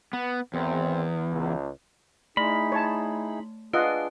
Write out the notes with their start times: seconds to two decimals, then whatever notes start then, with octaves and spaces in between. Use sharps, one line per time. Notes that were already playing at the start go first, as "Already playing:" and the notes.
0.13 B3
0.54 G#1 E2 C4
1.32 C#2
2.37 A3 D#4 E4 G#4 B5
2.72 C#5 A5
3.73 D4 F4 G#4 B4 D#5 F#5